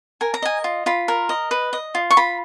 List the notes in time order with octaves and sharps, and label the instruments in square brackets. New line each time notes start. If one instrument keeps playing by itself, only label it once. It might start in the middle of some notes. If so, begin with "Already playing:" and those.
[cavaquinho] A#4 G#5
A#5
D#5 G#5
F4
F4 B5
A#4
D#5
B4
D#5
F4
C#6
F4 B5